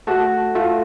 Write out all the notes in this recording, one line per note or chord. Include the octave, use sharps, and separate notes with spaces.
A3 F#4
A3 F4